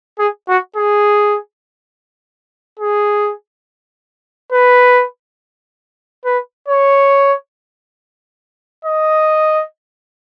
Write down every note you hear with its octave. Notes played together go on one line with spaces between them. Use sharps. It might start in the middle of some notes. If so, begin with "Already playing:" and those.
G#4
F#4
G#4
G#4
B4
B4
C#5
D#5